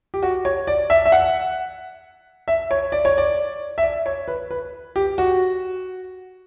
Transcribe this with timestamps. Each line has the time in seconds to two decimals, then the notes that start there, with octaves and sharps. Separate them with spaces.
0.14 G4
0.23 F#4
0.45 C#5
0.67 D5
0.90 E5
1.06 E5
1.12 F#5
2.48 E5
2.71 C#5
2.92 D5
3.05 C#5
3.18 D5
3.78 E5
3.83 D5
4.06 C#5
4.28 B4
4.51 B4
4.96 G4
5.18 F#4